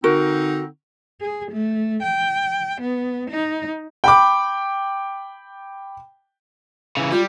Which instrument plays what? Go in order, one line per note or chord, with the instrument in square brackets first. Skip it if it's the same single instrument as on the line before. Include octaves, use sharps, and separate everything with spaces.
[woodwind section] D3 C4 D#4 [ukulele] F#4 A#4
[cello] G#4
A3
G5
B3
D#4
[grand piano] G5 B5 D6
[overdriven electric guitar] C#3 E3
[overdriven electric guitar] G3 [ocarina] F4